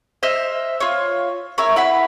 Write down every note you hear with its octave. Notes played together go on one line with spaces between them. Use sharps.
C5 D#5 E5 F6
F4 C#5
E4 A#4 C#5
E4 F#5 B5